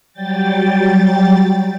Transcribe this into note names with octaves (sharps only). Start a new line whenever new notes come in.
F#3 G3 G5 A6